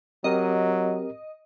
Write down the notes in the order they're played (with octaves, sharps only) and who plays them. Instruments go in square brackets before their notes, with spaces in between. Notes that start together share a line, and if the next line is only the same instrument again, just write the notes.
[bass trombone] F#3 [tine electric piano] C4 G4 A#4 [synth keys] D#5